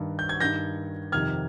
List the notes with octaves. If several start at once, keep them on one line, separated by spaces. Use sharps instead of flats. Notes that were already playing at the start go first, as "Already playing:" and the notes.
Already playing: G2 D#3
G6
G#6
G2 D#3 G6 A#6
F2 C3 D#3 F6 G#6